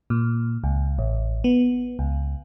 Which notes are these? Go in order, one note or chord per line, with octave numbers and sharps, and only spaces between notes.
A#2
C#2
A1
B3
C#2